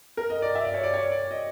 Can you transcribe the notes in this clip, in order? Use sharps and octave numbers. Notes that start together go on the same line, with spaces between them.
A#4
D#5
D5
E5
D5
C#5
D5
C#5
D5
D#5